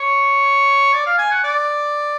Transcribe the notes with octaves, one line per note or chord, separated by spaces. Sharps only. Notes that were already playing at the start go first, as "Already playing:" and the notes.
Already playing: C#5
D5
F5
G#5
F#5
D5